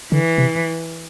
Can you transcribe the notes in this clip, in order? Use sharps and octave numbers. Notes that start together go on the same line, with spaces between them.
D3 E3
C3